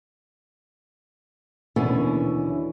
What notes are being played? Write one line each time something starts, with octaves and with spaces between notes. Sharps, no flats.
D#2 B2 D3 E3 C#4